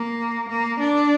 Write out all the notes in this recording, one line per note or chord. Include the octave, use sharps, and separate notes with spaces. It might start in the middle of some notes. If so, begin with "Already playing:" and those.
Already playing: A#3
A#3
D4